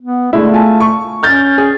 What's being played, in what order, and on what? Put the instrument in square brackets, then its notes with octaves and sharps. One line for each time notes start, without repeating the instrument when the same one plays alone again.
[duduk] B3
[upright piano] D3 G#3 E4 [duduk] A3
[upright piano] F4 G#5 A5
C#6
[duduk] C#4 [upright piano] F6 G6 A6
[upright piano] G#4